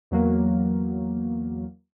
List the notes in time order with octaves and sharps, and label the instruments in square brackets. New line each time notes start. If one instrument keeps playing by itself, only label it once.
[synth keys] E2 F#3 A#3